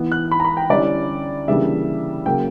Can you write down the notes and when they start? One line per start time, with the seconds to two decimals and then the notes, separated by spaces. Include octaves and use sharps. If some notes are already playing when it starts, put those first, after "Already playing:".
Already playing: E3 B3 E4
0.12 F#6
0.31 B5
0.40 A#5
0.44 B5
0.57 G5
0.69 D3 G3 C#4 E4 D5
1.48 C#3 E3 G3 A#3 D4 E5
2.26 C#3 F#3 A#3 G5